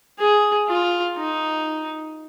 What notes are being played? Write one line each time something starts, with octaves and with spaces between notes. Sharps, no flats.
G#4
F4
D#4